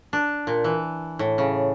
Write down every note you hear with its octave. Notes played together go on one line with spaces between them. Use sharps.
D4
A#2
E3
A2
C#3